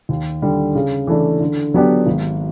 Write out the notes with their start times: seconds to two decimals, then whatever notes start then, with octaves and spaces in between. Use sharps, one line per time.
0.09 D#2
0.42 D3 G3
0.75 C#3
1.07 E3 A3 D4
1.40 D3
1.74 F#3 B3 D4 G4
2.06 G#1